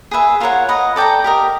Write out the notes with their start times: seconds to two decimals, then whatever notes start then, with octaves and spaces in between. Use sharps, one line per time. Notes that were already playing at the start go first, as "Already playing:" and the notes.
0.11 G#4 B4 E5
0.40 F4 A#4 C#5 F#5
0.69 B4 D#5 F#5
0.96 A4 D5 G5 A#5
1.24 G4 A#4 D#5